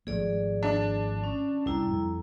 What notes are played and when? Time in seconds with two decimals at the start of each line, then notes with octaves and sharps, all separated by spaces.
0.07 G#1 F3 A3 G#4 D5
0.63 D4
1.24 C#4
1.66 C2 G3 E4 A#5
1.87 F2